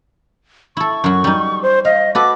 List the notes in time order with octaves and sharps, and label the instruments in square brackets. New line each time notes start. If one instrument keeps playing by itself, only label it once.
[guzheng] E4 A4 [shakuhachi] C#6
[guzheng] F#2 F#3
G3 D#4
[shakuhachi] C5
[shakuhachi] D#5 [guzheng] F5
[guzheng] F#4 A4 B4 [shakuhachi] D6